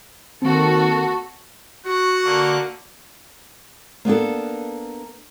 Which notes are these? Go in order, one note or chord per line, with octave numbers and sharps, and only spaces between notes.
D#3 A#3 C4 F#4 A4
F#4 F#5 C#6
D3 A#3 F#6
A#3 B3 D4 A4